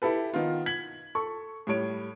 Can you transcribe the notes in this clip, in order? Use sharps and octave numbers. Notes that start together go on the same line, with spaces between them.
E4 G4 A4 B4
D#3 B3 F4
G#6 B6 F#7
A4 C#6
A2 G3 C#5 D7